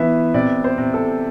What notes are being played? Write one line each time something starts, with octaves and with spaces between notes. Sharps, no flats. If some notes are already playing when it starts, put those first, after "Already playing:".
Already playing: E3 B3 E5
C3 D5
C5
C3
A4